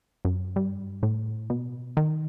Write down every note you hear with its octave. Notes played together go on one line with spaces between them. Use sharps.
F#2
G2
A2
B2
D#3